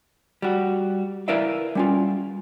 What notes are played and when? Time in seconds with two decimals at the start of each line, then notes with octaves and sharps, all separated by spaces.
0.42 G3 F#4
1.28 E4 A#4 B4 D5 E5 F5
1.75 G3 C#4 F4